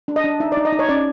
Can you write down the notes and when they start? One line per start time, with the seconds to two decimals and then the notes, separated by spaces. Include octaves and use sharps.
0.08 D4
0.16 D#5
0.24 D4
0.40 D#4 E5
0.52 D5
0.57 D#4
0.65 D#5
0.72 D#4
0.79 C#5
0.89 C#4 D5